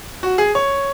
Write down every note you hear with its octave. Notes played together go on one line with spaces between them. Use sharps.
F#4
G#4
C#5